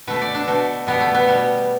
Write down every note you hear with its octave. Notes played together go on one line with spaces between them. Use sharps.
B2 A3 B4
D5
D4
B2 A3
B2 G3 B3
A3
B3
B2 G3